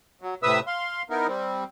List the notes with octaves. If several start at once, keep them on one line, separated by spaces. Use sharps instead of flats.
F#3
A2 C3 B4 E5 D#6 E6
F5 C6
B3 D#4 E4 A#4
G3 C4